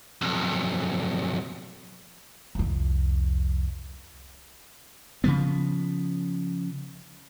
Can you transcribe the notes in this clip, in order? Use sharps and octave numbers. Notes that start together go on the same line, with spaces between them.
B1 F2
C2 F2
C#3 F3 B3